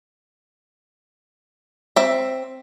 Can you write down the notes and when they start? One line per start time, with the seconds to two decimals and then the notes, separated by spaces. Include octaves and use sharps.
1.96 C4 E5